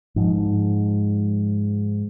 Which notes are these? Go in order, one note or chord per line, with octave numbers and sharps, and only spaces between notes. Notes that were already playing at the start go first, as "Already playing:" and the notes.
G#2 F3